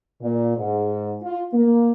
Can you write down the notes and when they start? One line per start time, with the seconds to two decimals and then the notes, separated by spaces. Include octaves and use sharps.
0.20 A#2
0.56 G#2
1.23 F4
1.52 A#3